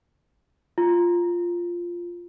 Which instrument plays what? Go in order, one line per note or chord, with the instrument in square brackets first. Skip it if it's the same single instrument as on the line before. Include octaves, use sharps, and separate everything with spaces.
[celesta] F4